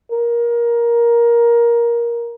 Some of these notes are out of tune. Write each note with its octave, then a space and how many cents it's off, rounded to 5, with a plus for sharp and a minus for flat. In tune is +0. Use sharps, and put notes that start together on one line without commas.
A#4 +15